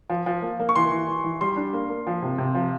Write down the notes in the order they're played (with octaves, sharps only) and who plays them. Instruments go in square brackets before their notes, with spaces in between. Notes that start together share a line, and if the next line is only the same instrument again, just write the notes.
[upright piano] F3
F3
A#3
A#3
[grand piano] C#6
[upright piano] E3 [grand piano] C6
[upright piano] E3
E3
E3
[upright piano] G3 [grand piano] C6
[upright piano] D4
A#3
A#3
F3
C3
C3
F3